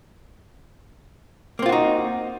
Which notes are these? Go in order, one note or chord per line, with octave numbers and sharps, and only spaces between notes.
A#3 C4 D#4 F4 F#4